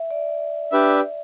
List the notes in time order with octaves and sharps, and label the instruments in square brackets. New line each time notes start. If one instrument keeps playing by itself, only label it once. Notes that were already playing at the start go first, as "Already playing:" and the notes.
Already playing: [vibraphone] E5
D5
[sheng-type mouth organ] D4 G4 B4 E5